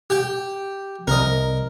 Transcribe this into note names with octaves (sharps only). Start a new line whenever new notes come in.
G4 G5
C2 A#4 D#5